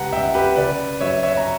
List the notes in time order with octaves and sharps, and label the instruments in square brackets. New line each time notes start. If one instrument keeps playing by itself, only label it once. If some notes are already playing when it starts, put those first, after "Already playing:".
Already playing: [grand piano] C#2 C#3 G3 G4 B4 F#5 A#5
C#2 E5 G5
G4 B4
C#3 B4 D5
F#3 C#5 E5
C#5 E5
A#5